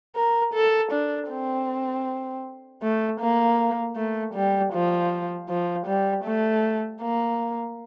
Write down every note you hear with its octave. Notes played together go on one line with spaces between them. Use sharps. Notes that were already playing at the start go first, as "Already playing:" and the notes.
A#4
A4
D4
C4
A3
A#3
A3
G3
F3
F3
G3
A3
A#3